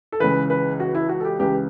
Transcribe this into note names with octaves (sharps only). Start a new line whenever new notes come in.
A4
C#2 C#3 E3 B4
B4
F#4
E4
F#4
A4
G4
C#2 C#3 E3 G4